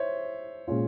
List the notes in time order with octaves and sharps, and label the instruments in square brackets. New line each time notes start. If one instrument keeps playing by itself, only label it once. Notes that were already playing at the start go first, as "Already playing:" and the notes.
Already playing: [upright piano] C5 C#5 E5
[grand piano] A#2 G#3 C#4 F4